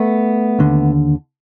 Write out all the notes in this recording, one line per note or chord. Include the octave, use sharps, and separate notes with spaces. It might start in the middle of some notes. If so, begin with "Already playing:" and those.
Already playing: A3 B3
D#2 D3